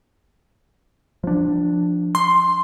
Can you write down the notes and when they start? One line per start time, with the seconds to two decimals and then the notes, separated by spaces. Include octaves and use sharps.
1.24 F3 D4
2.15 C6